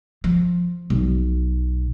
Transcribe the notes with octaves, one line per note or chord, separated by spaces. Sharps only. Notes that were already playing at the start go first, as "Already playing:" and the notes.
F3
B1